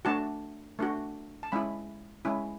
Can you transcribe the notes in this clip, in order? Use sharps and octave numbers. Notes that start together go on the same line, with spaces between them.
A3 D4 F#4 A5
A3 D4 F#4
A5
G#3 C#4 E4 B5
G#3 C#4 E4